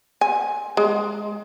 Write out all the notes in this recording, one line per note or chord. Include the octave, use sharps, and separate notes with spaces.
G#5
G#3